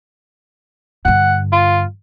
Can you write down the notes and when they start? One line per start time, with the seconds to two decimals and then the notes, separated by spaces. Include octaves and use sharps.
1.05 G2 D3 F#5
1.53 F4